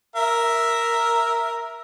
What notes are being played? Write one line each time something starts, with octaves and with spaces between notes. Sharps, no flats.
A#4 E5